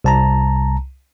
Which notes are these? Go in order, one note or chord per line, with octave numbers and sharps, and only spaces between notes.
C2 A5 A#5